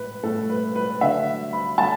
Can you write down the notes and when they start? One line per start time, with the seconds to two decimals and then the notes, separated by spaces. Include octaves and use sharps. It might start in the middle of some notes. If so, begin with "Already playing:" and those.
Already playing: A2 B4
0.23 A2 A3 A4
0.49 B4
0.76 B4
1.01 D3 F#3 A3 E5
1.53 B5
1.78 D3 F#3 A3 A5